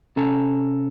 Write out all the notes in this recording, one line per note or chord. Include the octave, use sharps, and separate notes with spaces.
C3 C#4 A4 A5 A#5